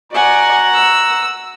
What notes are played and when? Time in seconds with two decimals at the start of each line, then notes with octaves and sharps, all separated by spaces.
0.12 F#4 D5 F#5 G#5 A#5
0.74 E6